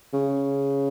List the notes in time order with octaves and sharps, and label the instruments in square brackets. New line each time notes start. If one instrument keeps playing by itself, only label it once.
[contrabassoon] C#3